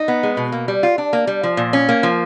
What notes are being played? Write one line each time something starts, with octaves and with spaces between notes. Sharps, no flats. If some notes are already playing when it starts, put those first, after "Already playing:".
Already playing: D#4
B3
G#3
B2
A#3
G3
F4
D4
A#3
G3
F3
A#2
C#4
A#3
F3